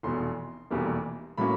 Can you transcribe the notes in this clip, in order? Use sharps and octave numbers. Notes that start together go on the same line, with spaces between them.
F1 E2 B2 C6
F1 E2 B2 G3 A#3
A2 F#3 A#3 C#4 B5